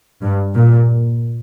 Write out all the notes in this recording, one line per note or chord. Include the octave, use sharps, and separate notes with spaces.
G2
A#2